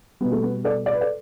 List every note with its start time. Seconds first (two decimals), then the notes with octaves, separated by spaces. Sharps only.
0.21 B2 G3 B3
0.32 A3
0.43 B3
0.65 A4 D5
0.86 D5
0.93 B4
1.01 A4 D5